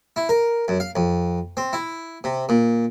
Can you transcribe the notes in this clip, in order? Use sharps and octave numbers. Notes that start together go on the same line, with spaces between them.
E4
A#4
F#2
F5
F2
C4
E4
C3
A#2